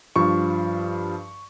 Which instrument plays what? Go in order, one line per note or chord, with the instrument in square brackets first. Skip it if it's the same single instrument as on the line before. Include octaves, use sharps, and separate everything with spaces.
[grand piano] G2 F3 C#6